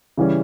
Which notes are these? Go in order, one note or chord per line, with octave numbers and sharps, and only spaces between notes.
C#3 E3 G3 C#4